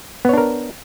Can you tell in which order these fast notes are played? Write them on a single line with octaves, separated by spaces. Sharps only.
B3 C#5 D4 A#4